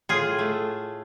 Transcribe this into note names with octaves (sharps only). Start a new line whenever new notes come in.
A2 F4 G#4
A3